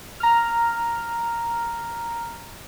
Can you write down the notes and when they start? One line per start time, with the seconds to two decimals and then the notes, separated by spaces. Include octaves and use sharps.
0.20 A#5 F6